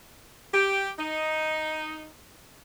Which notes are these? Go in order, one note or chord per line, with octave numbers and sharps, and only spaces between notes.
G4
D#4